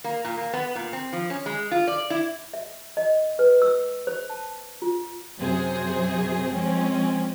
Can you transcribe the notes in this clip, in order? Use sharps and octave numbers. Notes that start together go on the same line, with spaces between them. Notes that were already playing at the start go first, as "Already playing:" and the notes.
A#3
A#2
A#3
B3
A#2
C4
F3
C#4
G#3
F4
D5
E4
E5
D#5
B4
E6
C5
A5
F4
F#2 C3 G#4 C5
F3 G#3 C4 C#4